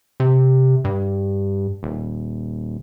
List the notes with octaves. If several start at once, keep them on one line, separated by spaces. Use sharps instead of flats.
C3
G2
D#1